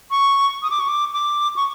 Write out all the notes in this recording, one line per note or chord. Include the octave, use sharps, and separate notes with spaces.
C#6
D#6
D6
C#6
D6
D6
C#6